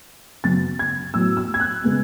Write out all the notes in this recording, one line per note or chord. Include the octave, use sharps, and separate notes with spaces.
F#2 C#3 F#3 B3 A6
G#6
A2 F#3 B3 E6
E6
G#6
F#6
C#3 G#3 B3